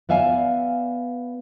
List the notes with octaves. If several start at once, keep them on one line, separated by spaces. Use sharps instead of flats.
B3 D5 E5 F5 G#5